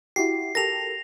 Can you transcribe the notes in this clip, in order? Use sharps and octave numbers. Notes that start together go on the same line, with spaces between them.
E4 F#4 G4 C7
G4 A4 A#4 A#6 F7